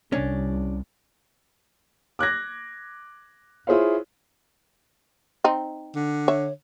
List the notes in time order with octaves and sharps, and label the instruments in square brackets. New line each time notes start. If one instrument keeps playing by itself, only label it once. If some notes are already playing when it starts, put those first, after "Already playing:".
[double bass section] C2 [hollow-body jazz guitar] C#4 D4
[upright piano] D6 F#6 G#6 A#6
E4 F4 G#4 C5 C#5 F5
[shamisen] C4 D#4
[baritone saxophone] D3
[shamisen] C#5 E5